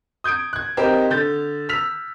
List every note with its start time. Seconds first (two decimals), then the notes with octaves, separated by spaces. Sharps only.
0.24 D#6 G6 G#6 D7
0.53 F#6 G#6
0.77 C4 D#4 G4 A#4 C5
1.10 D3 G6 A6
1.69 E6 F6 B6 F7